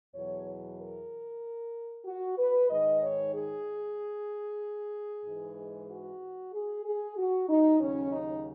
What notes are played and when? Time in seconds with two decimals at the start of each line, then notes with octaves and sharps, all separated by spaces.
0.14 E2 B2 F#3 C#5
0.78 A#4
2.05 F#4
2.38 B4
2.69 G#2 D#3 G#3 D#5
3.01 C#5
3.33 G#4
5.24 G#2 E3 G#3
5.88 F#4
6.52 G#4
6.84 G#4
7.17 F#4
7.48 D#4
7.80 D#2 C#3 F#3 C#4
8.12 D#4